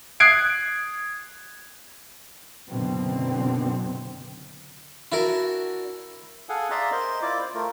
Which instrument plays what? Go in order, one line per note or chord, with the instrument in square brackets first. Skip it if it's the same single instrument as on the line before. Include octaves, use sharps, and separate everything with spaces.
[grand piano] D#6 F#6 G#6 C7 D7
[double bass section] F#1 F#2 B2 D3 C4
[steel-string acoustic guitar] D4 F#4 [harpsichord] E4 A#4
[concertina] G#4 A4 F5 F#5 G#5
G#4 D5 E5 F5 A#5 C6
A#4 C5 D#5 C6
E4 F4 D5 D6
C5
A3 F4 A#4